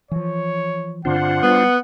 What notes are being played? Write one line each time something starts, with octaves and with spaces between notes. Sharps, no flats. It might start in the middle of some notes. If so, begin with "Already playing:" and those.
E3 F3 C#5
G2 D3 C4 D4 F4 C5 F#5
G3 B3